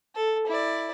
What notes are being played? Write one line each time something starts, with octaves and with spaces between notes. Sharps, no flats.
A4
E4 D5